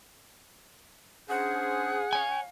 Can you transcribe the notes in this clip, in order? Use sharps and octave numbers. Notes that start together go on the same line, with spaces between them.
C#4 D4 G#4 C5 F#5
C#5 G#5